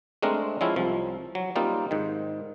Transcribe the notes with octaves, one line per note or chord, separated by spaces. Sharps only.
G#3 A3 C4 D4 A#4
F3 G#3 C4 C#4 E4
C2 F3
F#3
G3 A#3 C4 D#4 F4
G#2 D#3